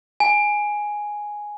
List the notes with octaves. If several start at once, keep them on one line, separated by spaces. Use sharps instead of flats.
G#5